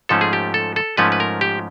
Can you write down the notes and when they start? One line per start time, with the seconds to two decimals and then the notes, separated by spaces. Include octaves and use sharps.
0.09 G#2 F3 A3 C#4 A4
0.21 G#4
0.33 G4
0.54 A4
0.76 A4
0.97 G#2 F3 A3 C#4 B4
1.12 B4
1.20 A#4
1.41 G4